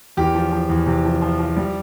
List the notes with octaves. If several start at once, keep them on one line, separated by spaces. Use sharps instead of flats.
E2 G4
F3
F3
E2
C3
F3
F3
F3
G3